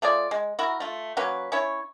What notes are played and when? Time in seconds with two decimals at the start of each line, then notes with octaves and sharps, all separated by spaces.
0.02 A3 F4 G#4 D5
0.31 G#3
0.59 E4 F#4 A#4
0.80 A3 F4
1.17 F#3 A#3 C#4 B4
1.52 C#4 E4 C#5